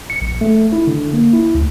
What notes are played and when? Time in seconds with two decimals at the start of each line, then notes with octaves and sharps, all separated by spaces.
0.10 C#7
0.22 A#1
0.41 A3
0.72 E4
0.87 D3
1.13 A#3
1.33 E4
1.55 D2